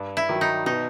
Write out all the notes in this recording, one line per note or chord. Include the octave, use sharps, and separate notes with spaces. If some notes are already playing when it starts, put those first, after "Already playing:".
Already playing: G2
E4
D#3 F#3
D#4
B2 D#4